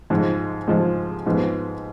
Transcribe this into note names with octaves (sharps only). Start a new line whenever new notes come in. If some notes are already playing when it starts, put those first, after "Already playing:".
G#2 F3 G#3
G#2 F3 G#3
G#2 F3 B3